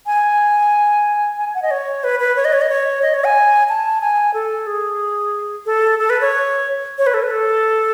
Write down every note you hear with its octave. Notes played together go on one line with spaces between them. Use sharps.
G#5
G#5
F#5
D#5
C#5
B4
B4
C#5
D#5
C#5
D#5
C#5
D#5
C#5
G#5
A5
G#5
A4
G#4
A4
A4
B4
C#5
C#5
B4
A4
B4
A4